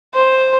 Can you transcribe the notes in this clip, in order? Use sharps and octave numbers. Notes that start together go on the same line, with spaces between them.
C5